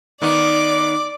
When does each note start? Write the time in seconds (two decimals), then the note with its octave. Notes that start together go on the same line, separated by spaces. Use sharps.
0.22 D#3 B3 D#4 D5 D6